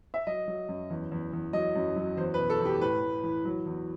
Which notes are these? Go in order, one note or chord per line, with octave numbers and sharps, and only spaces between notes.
E5
F#3 D#5
F#3
F#2
E2
E2
E2
F#3 D#5
F#2
F#3
E2 C5
B4
B2
A4
E2
G4
A2 B4
A2
E3
F#3
E2